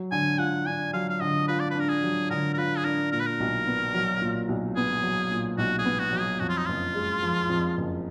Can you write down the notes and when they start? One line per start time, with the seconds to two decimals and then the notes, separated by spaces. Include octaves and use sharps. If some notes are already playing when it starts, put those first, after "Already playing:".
Already playing: F#3
0.12 D3 G#5
0.38 F4 F#5
0.66 D4 G#5
0.93 F#3 F5
1.09 F5
1.21 D3 D#5
1.48 F4 B4
1.60 D5
1.71 B4
1.75 D4 A#4
1.89 G#4
2.03 F#3
2.30 D3 A#4
2.54 A#4
2.58 F4 B4
2.77 G#4
2.84 D4 A#4
3.12 A#2 A#4
3.19 B4
3.26 A#4
3.40 B1
3.67 B3
3.94 F#3
4.21 A#2
4.49 B1
4.76 B3 G#4
5.03 F#3
5.31 A#2
5.58 B1 F#4
5.79 G#4
5.85 B3
5.99 F#4
6.12 F#3
6.19 G#4
6.40 F2 F#4
6.49 F4
6.57 D#4
6.66 F#1 F4
6.95 G#3
7.22 F3
7.49 F2
7.77 F#1